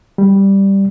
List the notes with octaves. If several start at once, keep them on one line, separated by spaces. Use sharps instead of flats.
G3